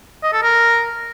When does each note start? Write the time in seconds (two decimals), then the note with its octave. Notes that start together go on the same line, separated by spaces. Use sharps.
0.23 D#5
0.33 A4
0.43 A#4